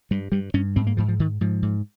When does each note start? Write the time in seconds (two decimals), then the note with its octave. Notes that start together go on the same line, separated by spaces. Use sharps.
0.11 G2 G3
0.32 G2 G3
0.54 G2 C#4
0.76 G#2 C4
0.87 A#3
0.97 G#2 F3
1.08 F3
1.19 G#2 D#3
1.41 G#2 F3
1.62 G#2